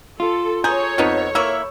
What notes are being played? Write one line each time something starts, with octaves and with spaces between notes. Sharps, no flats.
F4 A4
G#4 A4 C#5 A#5 G6
F2 F3 B3 D#4
A#3 E4 C#6 E6